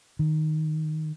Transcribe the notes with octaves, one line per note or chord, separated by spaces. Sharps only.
D#3